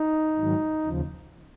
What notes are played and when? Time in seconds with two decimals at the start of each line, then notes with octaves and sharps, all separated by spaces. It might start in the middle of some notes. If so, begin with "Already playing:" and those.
Already playing: D#4
0.37 G#2 D#3 F#3
0.84 D#2 C#3 F3